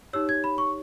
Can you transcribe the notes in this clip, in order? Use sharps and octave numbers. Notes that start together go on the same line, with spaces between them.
D#4 G4 C#5 E6
G#6
B5
C#6